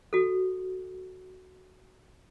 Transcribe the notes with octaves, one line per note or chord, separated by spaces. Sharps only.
F#4 A4